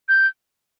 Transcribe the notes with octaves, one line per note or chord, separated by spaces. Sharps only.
G6